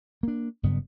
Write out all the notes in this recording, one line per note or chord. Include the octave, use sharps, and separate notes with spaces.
A#3 D4
F#1 G2 C#3 B3